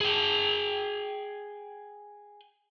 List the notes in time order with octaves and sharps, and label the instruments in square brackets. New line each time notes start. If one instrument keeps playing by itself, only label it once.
[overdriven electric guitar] G#4 G5